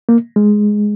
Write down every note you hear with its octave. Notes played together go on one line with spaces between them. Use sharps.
A#3
G#3